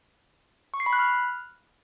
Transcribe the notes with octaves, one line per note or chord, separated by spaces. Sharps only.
C#6
C7
B5
F#6
F6